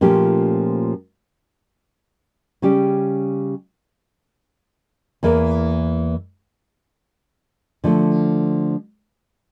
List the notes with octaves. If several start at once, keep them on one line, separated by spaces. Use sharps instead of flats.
A#2 F3 A3 C#4 G4
C#3 G3 C#4 G4
E2 E3 A#3 E4 A#4
D3 F3 A3